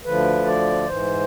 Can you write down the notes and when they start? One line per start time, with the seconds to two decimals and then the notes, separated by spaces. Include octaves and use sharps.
0.05 D2 D3 F3 B4
0.46 D5
0.86 G#2 E3 C5